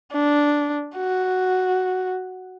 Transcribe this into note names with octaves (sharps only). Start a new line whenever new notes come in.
D4
F#4